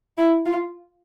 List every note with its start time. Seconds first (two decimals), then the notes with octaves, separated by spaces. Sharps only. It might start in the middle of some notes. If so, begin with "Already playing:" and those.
0.18 E4
0.46 F4